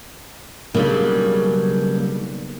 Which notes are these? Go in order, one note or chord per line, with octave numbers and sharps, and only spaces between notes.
B1 C#3 F#3 G3 A#3 D4